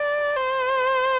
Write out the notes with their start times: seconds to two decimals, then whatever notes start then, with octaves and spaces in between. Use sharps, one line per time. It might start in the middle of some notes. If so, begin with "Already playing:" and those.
Already playing: D5
0.36 C5